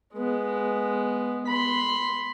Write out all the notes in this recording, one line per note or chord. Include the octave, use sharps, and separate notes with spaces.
G#3 B3
B5 C6